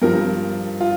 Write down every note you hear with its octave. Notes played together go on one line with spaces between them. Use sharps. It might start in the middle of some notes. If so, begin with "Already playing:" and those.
G2 F3 A#4
F4